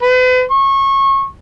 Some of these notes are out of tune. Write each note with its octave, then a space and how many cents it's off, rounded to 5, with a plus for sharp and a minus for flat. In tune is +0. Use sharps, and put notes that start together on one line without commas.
B4 +40
C#6 -25